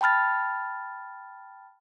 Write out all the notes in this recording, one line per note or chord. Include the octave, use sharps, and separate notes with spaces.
G5 A5 B5 F6 A6